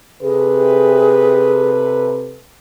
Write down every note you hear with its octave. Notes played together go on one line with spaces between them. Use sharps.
C3 G#4 A4 B4